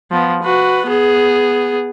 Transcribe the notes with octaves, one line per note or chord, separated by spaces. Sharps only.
F3 B3
F#4 B4
B3 G#4